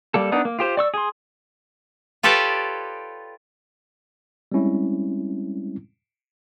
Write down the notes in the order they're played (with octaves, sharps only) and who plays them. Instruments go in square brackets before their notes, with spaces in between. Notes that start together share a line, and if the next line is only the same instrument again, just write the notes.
[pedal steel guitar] G3 A#3 A4
B3 D4 D#4
A#3
F4 G4 C5
D5 C#6 E6
G#4 C6
[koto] F4 G4 A4 B4 C#5 D5
[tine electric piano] G3 G#3 C4 C#4 E4